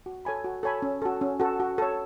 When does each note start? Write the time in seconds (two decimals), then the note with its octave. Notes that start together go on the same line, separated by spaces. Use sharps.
0.06 F#4
0.25 A4 C#5 G#5 B5
0.45 F#4
0.63 A4 C#5 G#5 B5
0.82 C#4
1.02 F#4 A4
1.21 C#4
1.40 F#4 A4
1.60 F#4
1.78 A4 C#5